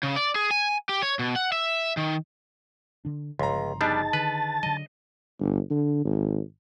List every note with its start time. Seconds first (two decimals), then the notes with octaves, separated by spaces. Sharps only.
0.03 C#3
0.16 D5
0.36 G#4
0.51 G#5
0.89 G4
1.02 C#5
1.19 B2
1.36 F#5
1.52 E5
1.97 D#3
3.05 D3 D4
3.39 G1 C#2 C#3 F3 A#5 C6
3.81 G3 B3 D4 D#4 G#4 A5
4.13 D3 D#3 B4
4.63 D3 F#3 D#5
5.40 G1
5.70 D3
6.05 G#1